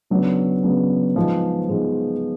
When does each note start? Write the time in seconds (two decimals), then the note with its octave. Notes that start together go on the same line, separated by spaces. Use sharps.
0.10 C#3 F#3 B3 D4
0.63 C#3 F#3 B3 D4
1.16 G#2 F3 G#3 B3
1.69 G#2 F3 G#3 B3